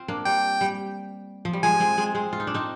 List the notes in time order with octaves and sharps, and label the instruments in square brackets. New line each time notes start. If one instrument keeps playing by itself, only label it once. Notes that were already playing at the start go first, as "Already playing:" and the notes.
Already playing: [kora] C4 F4
A#3 D4
[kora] G3 [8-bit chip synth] G5
[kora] G3
F3
G3
[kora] F3 G#3 [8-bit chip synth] G#5
[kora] G#3 C4
G#3 C4
G#3 C4
F4
D#4
D4
C4 D#4